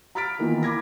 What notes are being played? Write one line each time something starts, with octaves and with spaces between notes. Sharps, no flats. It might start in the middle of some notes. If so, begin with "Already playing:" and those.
A#5 B5 F6 A6 B6 D7
D#3 E3 A#3 B3 F4
B5 D6 G#6 A#6